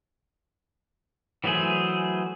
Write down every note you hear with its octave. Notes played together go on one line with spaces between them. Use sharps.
E3 F#3 A3 G#4 C5